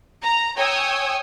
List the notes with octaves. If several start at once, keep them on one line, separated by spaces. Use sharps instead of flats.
A#5
C#5 G5 G#5 D#6 E6